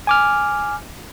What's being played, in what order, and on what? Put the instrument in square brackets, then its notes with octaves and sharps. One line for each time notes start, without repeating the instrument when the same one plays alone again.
[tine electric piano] G#5 D6 F6